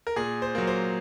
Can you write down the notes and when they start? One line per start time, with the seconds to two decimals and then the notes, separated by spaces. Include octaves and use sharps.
0.07 A#4
0.16 A#2 G#4
0.42 C5
0.55 F#3 A#3
0.67 C5